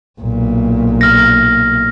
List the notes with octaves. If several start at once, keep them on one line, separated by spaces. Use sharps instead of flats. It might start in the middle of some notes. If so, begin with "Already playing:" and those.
B1 A#2
F6 A#6